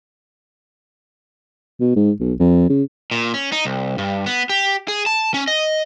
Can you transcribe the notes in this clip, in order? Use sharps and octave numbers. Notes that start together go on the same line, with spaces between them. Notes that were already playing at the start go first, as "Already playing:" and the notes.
B2
G#2
B1
F2
C#3
A#2
C#4
D#4
C2
G2
B3
G4
G#4
A5
C#4
D#5